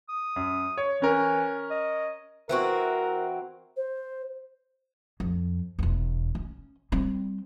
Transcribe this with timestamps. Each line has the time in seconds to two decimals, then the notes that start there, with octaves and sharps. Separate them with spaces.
0.09 D#6
0.36 F#2
0.77 C#5
1.02 E3 C#4 A#4
1.70 D#5
2.49 E3 C4 F#4 A#4
3.76 C5
5.20 F2
5.79 E1 E2
6.35 C#4
6.92 G3 C4